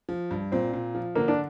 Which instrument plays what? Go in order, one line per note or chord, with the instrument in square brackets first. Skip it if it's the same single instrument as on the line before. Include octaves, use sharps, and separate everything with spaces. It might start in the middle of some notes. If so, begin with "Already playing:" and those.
[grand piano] F3
G2
[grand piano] A#2 [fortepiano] C4
[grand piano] A#2
F3
[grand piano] D3 [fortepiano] A#3
[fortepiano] D4